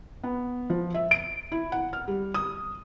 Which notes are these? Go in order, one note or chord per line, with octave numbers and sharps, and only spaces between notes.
B3
F3
E5
D7
E4
F#5
F6
G3
D#6